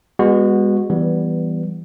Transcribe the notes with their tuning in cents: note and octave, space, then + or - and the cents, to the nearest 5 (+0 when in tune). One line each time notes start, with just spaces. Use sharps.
G#3 -35 B3 +0 F#4 -10
E3 +10 G3 +0 B3 +0